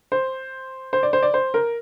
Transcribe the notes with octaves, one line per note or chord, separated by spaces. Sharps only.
C5
C5
D5
C5
D5
C5
A#4